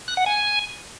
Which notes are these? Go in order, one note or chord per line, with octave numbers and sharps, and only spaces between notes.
F#6
F#5
G#5